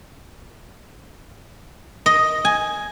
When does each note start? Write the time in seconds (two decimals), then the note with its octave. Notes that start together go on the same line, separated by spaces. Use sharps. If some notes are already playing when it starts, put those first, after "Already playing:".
2.06 D#5
2.45 G#5